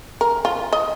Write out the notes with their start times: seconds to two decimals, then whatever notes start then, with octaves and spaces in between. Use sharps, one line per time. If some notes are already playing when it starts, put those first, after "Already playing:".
0.21 A#4
0.45 F4
0.73 D#5